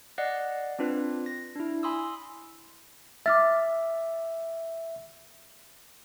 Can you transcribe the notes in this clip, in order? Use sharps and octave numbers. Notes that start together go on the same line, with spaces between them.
D5 D#5 F#5 F#6 A#6 C7
C4 D4 F4 B4
A#6
D4 E4
G#5 B5 C6 D#6 E6
E5 D6 F6 A6